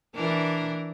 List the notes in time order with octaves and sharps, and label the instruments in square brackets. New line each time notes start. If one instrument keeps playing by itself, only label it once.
[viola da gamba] E3 D4 A#4